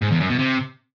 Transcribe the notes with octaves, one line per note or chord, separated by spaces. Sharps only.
G#2
E2
F#2
B2
C3